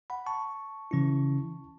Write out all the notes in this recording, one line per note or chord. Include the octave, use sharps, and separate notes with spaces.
F#5 B5
A5 C#6
C#3 E3 C#4 E4